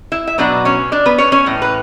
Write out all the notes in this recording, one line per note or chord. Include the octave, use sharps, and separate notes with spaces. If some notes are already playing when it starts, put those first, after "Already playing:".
E4 E5
E5
B2 F#3 B3 D4 D5
C#4 C#5
D4 D5
B3 B4
C#4 C#5
C#4 C#5
A2 E3
B4